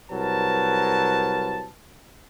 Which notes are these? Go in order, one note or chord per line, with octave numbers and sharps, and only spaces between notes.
C2 F#3 A#4 B4 A5